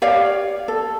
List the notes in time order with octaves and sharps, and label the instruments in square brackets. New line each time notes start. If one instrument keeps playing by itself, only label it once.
[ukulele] G4 C#5 D5 F5
A4